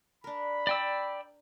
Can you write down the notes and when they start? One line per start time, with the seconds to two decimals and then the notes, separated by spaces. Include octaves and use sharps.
0.24 D4 A#4 B5
0.67 D5 G5 E6